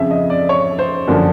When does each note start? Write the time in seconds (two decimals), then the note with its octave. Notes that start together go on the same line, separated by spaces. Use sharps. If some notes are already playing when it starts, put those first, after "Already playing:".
Already playing: F2 C#3 F3 E5
0.11 D#5
0.30 D5
0.49 C#5
0.79 C5
1.07 F#2 D3 F3 A#3